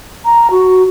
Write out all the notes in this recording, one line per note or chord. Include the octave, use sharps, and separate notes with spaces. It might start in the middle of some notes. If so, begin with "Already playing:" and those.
A#5
F#4